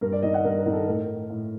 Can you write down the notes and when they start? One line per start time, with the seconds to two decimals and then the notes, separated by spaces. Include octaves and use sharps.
0.01 G2 A#4
0.12 D5
0.23 D#3 D#5
0.34 F#5
0.44 G2 A#4
0.58 A#4
0.66 D#3
0.73 A4
0.87 A2 A#4
1.30 A2